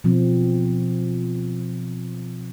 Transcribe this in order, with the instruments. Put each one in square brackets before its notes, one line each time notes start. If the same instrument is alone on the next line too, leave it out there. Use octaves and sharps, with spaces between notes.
[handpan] B2 F3 C4